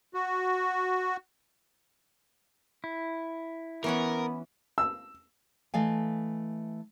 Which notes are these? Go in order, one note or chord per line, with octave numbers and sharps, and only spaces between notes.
F#4
E4
E3 B3 C#4 A#4 F#5
E6
E3 A3 D#5 F5 G#5